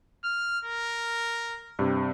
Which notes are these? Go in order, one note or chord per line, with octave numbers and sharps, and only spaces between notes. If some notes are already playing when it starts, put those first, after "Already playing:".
F6
A#4
G2 C3